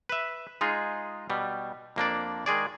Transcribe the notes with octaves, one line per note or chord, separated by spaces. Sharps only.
B4 E5
G#3 D#4 F4 G#4
B2 G3
F2 A#3 D4 D5
D#3 G#3 G#4 D5